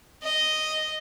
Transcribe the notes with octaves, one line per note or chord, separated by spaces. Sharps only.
D#5